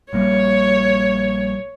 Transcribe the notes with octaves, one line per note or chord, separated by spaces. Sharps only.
A#1 G3 A#3 C#5